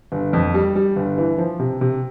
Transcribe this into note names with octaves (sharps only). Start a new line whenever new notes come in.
G1
F2
G3
G3
G1
E3
F3
C3
C3